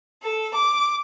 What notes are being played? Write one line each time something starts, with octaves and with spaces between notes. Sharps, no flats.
A4
D6